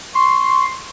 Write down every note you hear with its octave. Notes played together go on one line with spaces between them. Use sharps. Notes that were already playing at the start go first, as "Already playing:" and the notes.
C6 C#6